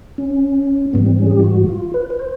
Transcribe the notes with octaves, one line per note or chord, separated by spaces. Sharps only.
C#4
G#2 E3 G3 B3
C4
C#4
G#4
G4
F4
F#4
F4
B4
B4
C5